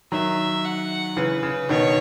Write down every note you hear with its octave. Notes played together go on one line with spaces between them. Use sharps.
D#3 F#3 E5
F#5
C#3 E3 B4
C#3
B2 D#3 C#5